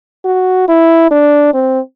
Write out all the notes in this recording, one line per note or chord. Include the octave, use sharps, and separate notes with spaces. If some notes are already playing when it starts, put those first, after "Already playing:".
F#4
E4
D4
C4